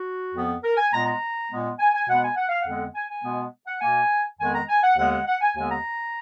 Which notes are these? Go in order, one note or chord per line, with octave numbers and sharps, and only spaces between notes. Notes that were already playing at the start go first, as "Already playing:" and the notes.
Already playing: F#4
F2 F3 B3
A#4
G#5
A#2 G#3 B3 A#5
A#5
A#2 G#3 B3
G#5
G#5
B2 G#3 B3 F#5
G#5
F#5
F5
F2 D3 G#3 B3 F#5
G#5
G#5
B2 G#3 B3
F#5
B2 A#3 G#5
F2 D#3 G#3 B3 G#5
A#5
G#5
F#5
D#2 D3 G#3 B3 F#5
F#5
F#5
G#5
D#2 D3 G#3 B3 G#5
A#5